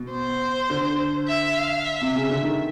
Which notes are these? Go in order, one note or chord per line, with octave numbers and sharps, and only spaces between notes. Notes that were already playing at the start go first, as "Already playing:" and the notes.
Already playing: B2
C5
D3
E5
F5
E5
C3
C#3
D3
D#3